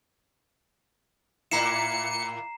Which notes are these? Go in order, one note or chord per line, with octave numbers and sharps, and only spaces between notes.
A2 A#3 E4 A#5 C7 C#7 E7